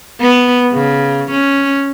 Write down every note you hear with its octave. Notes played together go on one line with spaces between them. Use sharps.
B3
C#3
C#4